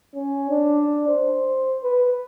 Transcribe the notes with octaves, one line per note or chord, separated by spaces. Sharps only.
C#4
D4
C5
B4